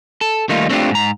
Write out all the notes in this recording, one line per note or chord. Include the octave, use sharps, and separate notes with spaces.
A4
D#3 G3 A3 A#3 D#4 F4
A3 C4 D4 D#4 F4 G4
G#2 A#5